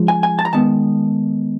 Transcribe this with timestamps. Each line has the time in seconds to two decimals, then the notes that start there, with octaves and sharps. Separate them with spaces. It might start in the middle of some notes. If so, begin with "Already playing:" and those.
Already playing: C#3 F3 G#3
0.08 G#5
0.23 G#5
0.39 A5
0.45 A#5
0.53 D#3 G#3 B3 A5